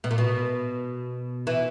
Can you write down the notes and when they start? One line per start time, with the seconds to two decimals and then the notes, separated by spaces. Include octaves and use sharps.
0.04 B2
0.11 A#2
0.18 B2
1.47 E3